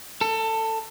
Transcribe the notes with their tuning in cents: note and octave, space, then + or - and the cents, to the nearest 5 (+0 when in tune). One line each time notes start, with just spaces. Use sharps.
A4 +20